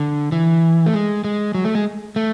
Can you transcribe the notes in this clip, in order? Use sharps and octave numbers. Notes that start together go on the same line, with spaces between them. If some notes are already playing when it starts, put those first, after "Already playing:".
Already playing: D3
E3
A3
G#3
G#3
F#3
A3
G#3
A3